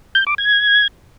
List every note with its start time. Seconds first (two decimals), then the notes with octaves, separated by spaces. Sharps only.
0.15 G6
0.27 D6
0.38 G#6